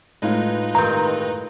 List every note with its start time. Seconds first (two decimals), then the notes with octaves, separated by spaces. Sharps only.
0.22 A2 G#3 D#4 F4 B4 D#5
0.75 G2 D#3 C4 A#5